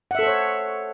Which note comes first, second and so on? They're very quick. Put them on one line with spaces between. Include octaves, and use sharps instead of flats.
F#5 E5 A4 C5 C#5